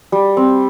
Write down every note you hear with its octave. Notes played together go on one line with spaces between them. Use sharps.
G3
C4